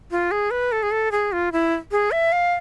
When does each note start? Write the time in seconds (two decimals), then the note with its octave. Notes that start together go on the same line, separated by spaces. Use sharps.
0.11 F4
0.31 G#4
0.51 B4
0.72 A4
0.83 G#4
0.91 A4
1.12 G#4
1.32 F4
1.52 E4
1.91 G#4
2.11 E5
2.32 F5